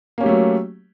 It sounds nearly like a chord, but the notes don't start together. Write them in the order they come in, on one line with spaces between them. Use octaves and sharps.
A#3 C#4 G4 A3 F#3